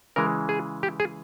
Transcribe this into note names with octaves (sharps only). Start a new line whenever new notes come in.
C#3 E3 G#3 A#4
G#4
G4
G#4